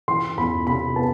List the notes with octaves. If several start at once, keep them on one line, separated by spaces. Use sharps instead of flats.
E3 C6
E2 B5
C3 B5
B3 A5